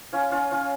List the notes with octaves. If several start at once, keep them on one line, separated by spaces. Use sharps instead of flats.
C#4 F4
C#4 F4
C#4 F4